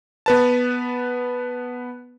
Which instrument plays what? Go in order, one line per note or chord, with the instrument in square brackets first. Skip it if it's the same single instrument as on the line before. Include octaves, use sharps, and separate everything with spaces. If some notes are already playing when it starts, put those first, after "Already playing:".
[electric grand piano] B3 B4 A5